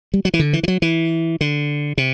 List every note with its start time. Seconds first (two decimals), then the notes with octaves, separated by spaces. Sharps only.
0.14 G3
0.25 F#3
0.34 E3
0.39 D3
0.53 E3
0.63 E3
0.68 F#3
0.82 E3
1.41 D3
1.98 C3